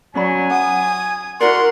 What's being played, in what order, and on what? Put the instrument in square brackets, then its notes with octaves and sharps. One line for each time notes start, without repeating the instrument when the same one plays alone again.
[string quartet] F#3 [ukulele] C#4 D5 B5 [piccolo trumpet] G#5
[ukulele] F#5 [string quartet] D#6
[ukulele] E4 F#4 D5 [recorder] A#4 [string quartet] F#5 [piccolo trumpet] C6